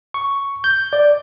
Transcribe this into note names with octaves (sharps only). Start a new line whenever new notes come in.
C#6
G6
D5